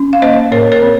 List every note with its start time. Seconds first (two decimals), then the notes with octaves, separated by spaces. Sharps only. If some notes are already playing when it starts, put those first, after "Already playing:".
Already playing: C#4
0.13 F5
0.22 A#3 C5 D#5
0.52 A2 A#4 C#5
0.72 A#4 C#5
0.82 C4